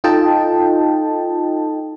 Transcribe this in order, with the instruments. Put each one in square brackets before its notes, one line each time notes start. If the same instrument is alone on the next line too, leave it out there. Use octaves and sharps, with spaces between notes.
[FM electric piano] D#4 F4 A4 D#5 G5 A5